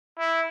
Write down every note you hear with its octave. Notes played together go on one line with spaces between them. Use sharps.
E4